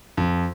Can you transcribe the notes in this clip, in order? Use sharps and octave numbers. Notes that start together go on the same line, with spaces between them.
F2